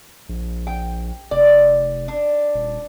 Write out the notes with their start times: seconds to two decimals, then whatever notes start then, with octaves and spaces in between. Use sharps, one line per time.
0.29 A#1
0.67 G5
1.31 F1 D5
2.08 D4
2.54 D#1